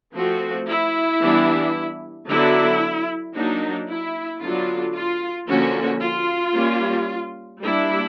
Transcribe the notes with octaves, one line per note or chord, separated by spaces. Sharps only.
F3 A3 C4 F#4
E4
E3 G3 B3 D4
D3 F#3 B3 D4 E4
F#3 A#3 D4 D#4
E4
D3 F#3 B3 D4 F4
F4
D3 F3 A#3 C#4 F#4
F4
G3 A#3 C#4
G3 A#3 D4 E4